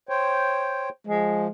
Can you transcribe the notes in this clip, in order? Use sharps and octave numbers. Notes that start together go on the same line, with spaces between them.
C5 C#5 G5
F3 G#3